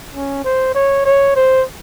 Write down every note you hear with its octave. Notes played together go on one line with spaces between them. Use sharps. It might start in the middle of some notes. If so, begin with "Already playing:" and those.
C#4
C5
C#5
C#5
C5